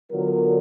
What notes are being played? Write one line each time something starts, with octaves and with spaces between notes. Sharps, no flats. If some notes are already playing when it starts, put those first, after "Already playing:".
D3 F#3 B3 F4 A#4